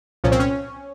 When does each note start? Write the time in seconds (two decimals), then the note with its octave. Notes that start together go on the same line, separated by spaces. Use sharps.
0.24 C2 A#2 F3 C#4
0.32 C4
0.39 C#4